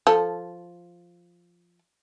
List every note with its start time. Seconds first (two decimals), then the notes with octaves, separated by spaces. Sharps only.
0.07 F3 A4